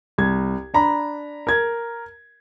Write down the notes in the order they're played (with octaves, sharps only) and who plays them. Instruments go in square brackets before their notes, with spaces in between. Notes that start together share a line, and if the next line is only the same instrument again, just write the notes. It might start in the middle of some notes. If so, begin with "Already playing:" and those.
[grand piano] C2 G#6
D4 A#5 B5
A#4 G#6